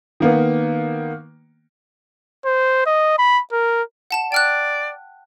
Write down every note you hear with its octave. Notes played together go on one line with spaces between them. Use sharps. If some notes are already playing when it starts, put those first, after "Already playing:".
D#3 A#3 B3
C5
D#5
B5
A#4
F#5 A5 E7
D5 G5 F6 F#6